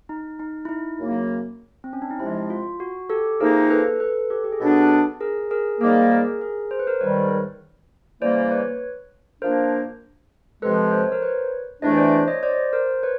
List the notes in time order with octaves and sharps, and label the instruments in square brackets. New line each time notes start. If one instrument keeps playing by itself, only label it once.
[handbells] D#4
D#4
E4
D#4
[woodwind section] F#2 C#3 F#3 A#3
[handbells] C4
C#4
D4
D#4
[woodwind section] C3 F3 G#3 [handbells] E4
[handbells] F4
F#4
G4 A4
[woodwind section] C3 F3 A#3 D#4 [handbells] G#4 A#4
[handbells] A4 B4
A4 B4
G4 A4
G4
G#4
[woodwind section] B2 F#3 B3 D4 [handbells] G4 A4
[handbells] G#4 A#4
G#4 A#4
[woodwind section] G#2 D#3 G3 A#3 [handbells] G#4 A#4
[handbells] G#4 A#4
G#4 A#4
C5
B4
A#4 C5
[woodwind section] G#2 D#3 G3 [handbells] B4 C#5
[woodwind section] C#3 E3 G3 A#3 [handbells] C5 D5
[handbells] B4 C#5
[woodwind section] A#2 F3 A#3 D4 [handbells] A#4 C5
[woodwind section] C3 F3 G#3 [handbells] A4 B4
[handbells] C5
C#5
A#4 C5
B4 C#5
[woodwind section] E2 C3 E3 A3 D4 [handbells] C#5 D#5
[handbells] C5 D5
C#5 D#5
C5 D5
A#4 C5
B4 C#5